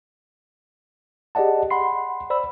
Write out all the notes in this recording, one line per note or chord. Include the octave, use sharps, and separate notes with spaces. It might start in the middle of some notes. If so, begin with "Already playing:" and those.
G4 G#4 D5 D#5 F#5 A5
F#5 B5 C6 C7
C5 D5 B5 E6